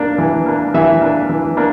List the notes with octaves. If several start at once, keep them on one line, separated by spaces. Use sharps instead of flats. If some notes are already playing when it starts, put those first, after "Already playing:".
Already playing: A#3 D4
E3
A#3 D4
E3 E5
A#3 D4
E3
A#3 D4